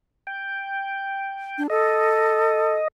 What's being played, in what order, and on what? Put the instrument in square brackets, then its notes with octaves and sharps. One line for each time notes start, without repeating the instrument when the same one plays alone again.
[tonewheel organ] G5
[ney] D4
[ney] A4 [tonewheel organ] D#5